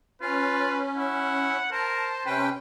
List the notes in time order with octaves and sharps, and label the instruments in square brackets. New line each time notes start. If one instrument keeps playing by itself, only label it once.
[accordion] C#4 [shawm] F4 [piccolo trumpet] B4
[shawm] E4 [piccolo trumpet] F#5
[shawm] A#4 [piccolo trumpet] C5 [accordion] A5
[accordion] C3 C#4 G5 [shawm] B4